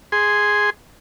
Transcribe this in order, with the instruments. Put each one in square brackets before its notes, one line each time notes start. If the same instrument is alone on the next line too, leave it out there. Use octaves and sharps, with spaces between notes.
[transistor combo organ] G#4 C6